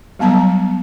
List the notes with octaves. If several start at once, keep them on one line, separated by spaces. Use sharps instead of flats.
F#3 G3 B3 A5 A#5